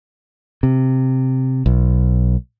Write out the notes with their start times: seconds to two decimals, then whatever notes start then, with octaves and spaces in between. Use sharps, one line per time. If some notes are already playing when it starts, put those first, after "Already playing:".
0.63 C3
1.66 B1